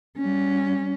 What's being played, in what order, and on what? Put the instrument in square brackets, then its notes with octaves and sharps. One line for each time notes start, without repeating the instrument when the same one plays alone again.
[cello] G3 C#4